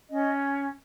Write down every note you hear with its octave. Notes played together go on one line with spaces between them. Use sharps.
C#4 D#5